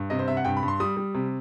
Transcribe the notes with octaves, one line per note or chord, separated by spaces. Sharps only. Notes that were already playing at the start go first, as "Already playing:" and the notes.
Already playing: G2
C3 D#5
C5
C3 E5
F#5
G2 G5
B5
G2
C6
G3 D#6
G3
C3